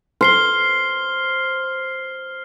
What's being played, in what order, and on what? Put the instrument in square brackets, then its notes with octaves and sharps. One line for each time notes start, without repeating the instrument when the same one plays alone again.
[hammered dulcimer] C5 [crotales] F6 C7 G7